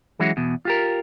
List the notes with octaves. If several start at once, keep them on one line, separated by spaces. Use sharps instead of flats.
E3 F#3 G#3 C#4 E4 F#4
E2 B2
F4 G4 A#4